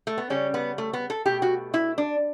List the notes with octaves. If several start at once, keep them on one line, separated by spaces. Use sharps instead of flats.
A3
B3
C#3 G3 C#4
B3
A3
B3
A4
B2 A3 G4
F#4
E4
D4